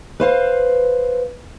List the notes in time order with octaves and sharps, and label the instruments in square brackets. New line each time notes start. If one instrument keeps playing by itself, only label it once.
[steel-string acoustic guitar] B4 C5 F5